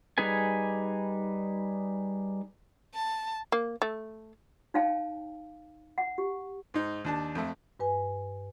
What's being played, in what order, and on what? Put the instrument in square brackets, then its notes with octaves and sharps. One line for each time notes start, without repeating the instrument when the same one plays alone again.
[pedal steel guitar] G3 D#4 G#4 B4 G#5
[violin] A5
[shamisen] A#3
A3
[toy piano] D#4 C#5 F5 G5 A5
F#5
G4
[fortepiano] G#2 D#4
D#2 D4 A5
F2 A3
[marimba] G2 B4 G#5